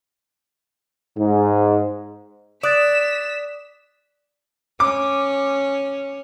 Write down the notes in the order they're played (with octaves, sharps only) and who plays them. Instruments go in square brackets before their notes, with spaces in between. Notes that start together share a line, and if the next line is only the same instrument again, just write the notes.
[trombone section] G#2
[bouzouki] D5 [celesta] D#6 F#6 A6 [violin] B6 E7
[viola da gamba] C#4 [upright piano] D6